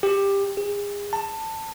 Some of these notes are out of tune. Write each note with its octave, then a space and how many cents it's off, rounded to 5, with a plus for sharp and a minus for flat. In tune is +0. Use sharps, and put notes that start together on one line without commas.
G4 +15
G#4 -35
A5 +20